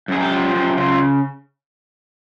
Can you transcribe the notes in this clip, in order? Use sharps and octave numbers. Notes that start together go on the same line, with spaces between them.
F#2 G#4
G4
F3
F#2 G4
C#3 F4